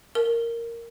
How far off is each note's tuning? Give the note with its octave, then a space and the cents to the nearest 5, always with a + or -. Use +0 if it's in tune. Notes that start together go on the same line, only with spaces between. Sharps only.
A#4 -5